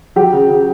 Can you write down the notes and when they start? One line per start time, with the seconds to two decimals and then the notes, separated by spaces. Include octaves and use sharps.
0.16 F#3 G4
0.33 C#3
0.49 C#3